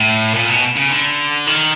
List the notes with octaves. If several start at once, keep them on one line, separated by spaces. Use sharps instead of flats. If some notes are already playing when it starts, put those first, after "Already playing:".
Already playing: A2
A#2
B2
C#3
D3
D#3